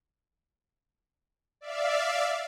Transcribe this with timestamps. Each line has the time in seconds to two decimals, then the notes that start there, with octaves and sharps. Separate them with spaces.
1.61 D5 E5 F5